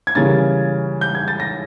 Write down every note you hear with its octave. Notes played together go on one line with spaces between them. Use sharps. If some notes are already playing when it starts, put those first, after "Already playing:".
G#6
C#3 E3 G3 A#3 C#4 A6
G6
G#6
A6
A#6